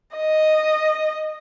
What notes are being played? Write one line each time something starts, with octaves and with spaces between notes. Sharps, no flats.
D#5